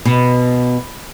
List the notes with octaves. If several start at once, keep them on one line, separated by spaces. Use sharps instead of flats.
B2